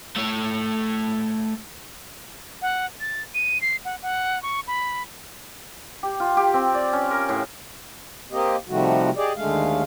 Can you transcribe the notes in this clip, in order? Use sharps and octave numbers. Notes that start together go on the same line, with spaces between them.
A3 C#5
F#5
A6
D#7
C7
F#5
F#5
C#6
B5
G4
F4
G4
C4
D5
C#4
A#4
A2
A#3 C4 G4 D#5
C3 D#3 F3 G3 A3 F#4
G4 G#4 D5 D#5
D#2 D3 G#3 A3 F5